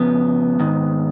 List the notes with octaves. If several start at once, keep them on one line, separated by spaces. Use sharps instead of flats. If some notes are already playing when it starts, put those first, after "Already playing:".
Already playing: F2 C#3 F3 B3
G#2 D#3